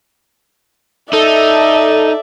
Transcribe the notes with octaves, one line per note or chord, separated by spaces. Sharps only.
D#4 A4 D5 E5